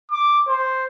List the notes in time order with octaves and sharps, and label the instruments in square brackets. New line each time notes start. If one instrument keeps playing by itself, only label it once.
[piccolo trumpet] D6
C5